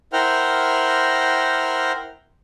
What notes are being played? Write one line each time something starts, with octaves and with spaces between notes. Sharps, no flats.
E4 A#4 C5 F#5 G5 F6